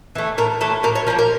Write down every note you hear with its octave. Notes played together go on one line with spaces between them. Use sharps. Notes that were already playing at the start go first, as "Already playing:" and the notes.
E3 A3
A2 A#4
E3 A3 A4
A2 A#4
C#5
F3 A#3 A#4
A#4